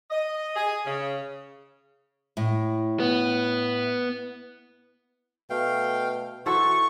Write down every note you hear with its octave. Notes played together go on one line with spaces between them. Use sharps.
D#5
G#4
C#3
A2
B3
B2 A3 F5 G5
E3 F#4 A4 C5 C#6